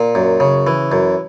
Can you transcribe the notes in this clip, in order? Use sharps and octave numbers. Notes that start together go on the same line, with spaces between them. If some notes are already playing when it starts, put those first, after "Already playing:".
Already playing: A#2
F#2
C#3
E3
F#2